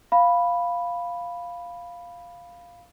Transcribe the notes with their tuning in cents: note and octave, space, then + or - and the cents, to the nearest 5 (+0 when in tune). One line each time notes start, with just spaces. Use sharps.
F5 +0 B5 +0